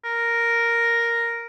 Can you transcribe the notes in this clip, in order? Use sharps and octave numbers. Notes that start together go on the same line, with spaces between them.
A#4